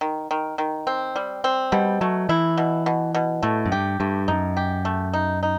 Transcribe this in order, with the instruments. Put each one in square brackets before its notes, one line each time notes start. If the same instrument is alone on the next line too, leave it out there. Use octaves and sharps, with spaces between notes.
[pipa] D#3
D#3
D#3
C4
G3
C4
[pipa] B2 [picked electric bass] G3
[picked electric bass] F#3 [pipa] A3
[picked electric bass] E3 [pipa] E4
[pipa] B2
B2
B2
[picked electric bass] A2 [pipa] A3
[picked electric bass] F#2
[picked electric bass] G2 [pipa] G4
[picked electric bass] G2 [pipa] A3
[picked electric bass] F#2 [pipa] D#4
[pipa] G4
A3
D#4
D#4